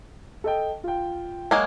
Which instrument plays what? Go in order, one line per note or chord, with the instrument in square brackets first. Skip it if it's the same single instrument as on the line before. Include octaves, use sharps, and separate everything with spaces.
[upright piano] A4 D#5 G5
F4 G5
[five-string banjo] F#3 G#3 A#3